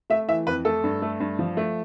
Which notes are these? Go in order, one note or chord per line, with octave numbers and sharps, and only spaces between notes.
A3 E5
E3 E5
F2 B4
A3 A4
G2
A3
G2
F3
A3